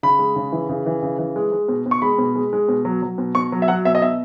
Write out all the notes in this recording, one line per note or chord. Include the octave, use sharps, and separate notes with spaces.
C#3 B5
G#3
C#3
E3
C#3
E3
C#3
E3
G#3
G#3
B2
B2
C#6
G#3 B5
B2
G#3
G#3
B2
F#3
F#3
B2
B2 C#6
F#3
E5
F#3 F#5
B2 E5
D#5
B2 E5